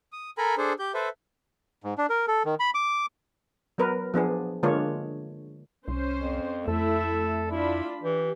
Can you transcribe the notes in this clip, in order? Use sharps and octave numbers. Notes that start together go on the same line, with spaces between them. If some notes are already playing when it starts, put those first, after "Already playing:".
D#6
A4 A#4 G#5 A#5 B5
D4 G#4 A4 C5
G4 G6
A4 B4 C5 E5
G#2
D4
A#4
A4
D#3
B5
D6
F#3 B3 A#4 B4
F3 B3 D4 G#4
D3 G#3 A#3 D4 F4 C#5
C2 C#4 C5
F2
F2 A3 E4 A4 E5
D4 E4 F4 B5
E3 G4